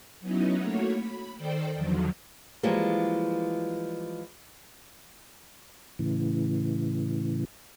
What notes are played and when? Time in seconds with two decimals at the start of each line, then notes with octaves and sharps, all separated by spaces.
0.21 F#3 B3 C#4 D#4 E4
0.56 A3 A#3 F#4 C#5
0.88 B5
1.35 D#3 A4 C5 D5 G5
1.76 E2 D3 D#3 F3 F#3
2.63 E3 F3 G3 G#3 A#3
5.99 A2 C#3 E3